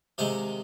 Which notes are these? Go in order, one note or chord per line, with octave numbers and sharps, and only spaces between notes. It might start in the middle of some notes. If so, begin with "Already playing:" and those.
C3 D#3 G#3 F5